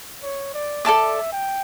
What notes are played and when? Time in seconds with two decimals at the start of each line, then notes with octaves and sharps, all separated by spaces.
0.23 C#5
0.54 D5
0.85 A4 D5 E5 A5 D6
1.32 G5